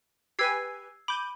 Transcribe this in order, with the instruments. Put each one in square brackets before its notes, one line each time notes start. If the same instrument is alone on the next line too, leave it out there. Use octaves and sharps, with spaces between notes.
[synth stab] G4 B4 G#5 [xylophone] E6 G#6 C7
[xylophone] B5 [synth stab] D6 G6 D#7